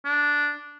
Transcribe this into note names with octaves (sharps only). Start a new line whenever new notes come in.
D4